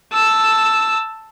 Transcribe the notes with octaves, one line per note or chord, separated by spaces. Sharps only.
A5 E6